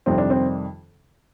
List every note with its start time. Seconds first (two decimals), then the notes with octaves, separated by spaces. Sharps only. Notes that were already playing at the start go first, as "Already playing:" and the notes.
0.06 F2 C3 D#3 G3 C4
0.18 D4
0.30 C4